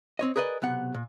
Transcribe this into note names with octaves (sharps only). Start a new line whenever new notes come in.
C4 C#5 D#5
G#4 A#4 B4 D5 D#5
B1 C3 B3 F#5
A#2